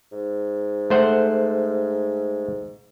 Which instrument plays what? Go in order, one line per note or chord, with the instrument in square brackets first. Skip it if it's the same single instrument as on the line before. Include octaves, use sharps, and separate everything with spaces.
[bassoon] G#2
[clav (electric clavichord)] A3 C5 F#5